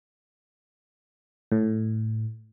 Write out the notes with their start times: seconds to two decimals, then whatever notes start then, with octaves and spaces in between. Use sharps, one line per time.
1.52 A2